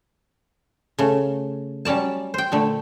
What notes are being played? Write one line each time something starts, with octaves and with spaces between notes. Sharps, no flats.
C#3 A3
F#3 G3 C#4 D5 A5
C5 G5
A#2 D3 A3